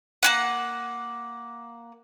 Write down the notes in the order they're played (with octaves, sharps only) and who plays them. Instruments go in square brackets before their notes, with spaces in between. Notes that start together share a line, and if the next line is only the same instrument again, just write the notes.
[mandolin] A#3 C#4 F#5